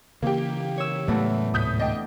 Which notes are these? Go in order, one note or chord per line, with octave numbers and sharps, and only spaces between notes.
C#3 E3 A#3 G4
C#5 E6
E2 A2 F#3 G#3 A3
D2 G#2 C3 D#6 G6 B6
D4 D#5 G5